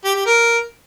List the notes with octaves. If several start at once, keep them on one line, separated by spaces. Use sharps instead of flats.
G4
G4
A#4